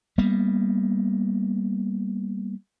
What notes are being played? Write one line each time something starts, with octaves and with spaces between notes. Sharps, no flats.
G3 A#3 B3